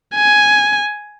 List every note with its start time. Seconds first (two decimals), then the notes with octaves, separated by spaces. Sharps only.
0.16 G#5